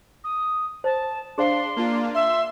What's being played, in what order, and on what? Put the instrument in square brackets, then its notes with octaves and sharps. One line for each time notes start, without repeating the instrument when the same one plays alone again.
[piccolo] D#6
[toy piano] C5 [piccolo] A5
[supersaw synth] D4 [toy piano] G#4 C5 F5 [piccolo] C6
[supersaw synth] A#3 D4 F4
[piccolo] E5 [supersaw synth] C6